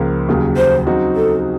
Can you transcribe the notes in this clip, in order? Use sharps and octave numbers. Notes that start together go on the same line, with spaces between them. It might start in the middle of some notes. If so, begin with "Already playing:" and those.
Already playing: C#2 C#3 F3 A#3
D#2 C#3 F#3
C5
C#3 F#3 C4 D#4 F#4
A4